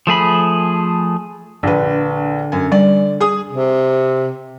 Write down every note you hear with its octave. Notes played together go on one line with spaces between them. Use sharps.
F3 A3 G#4 B5
A#1 D3 B4
F#2 G#5
G3 D5
G#4 D#6
C3